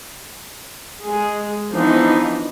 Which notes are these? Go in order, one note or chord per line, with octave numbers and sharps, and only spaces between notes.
G#3 G#4
E3 F3 B3 D4 D#4